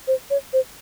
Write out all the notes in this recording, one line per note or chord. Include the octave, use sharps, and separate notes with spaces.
C5
C#5
C5